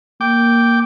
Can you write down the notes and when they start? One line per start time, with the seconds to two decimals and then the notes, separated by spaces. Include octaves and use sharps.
0.21 A#3 G5 D6